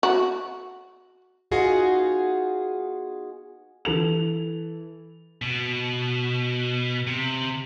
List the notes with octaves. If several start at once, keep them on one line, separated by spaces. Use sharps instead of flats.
F#4
B3 D#4 F4 F#4 G#4
E3 A4 F7
B2
C3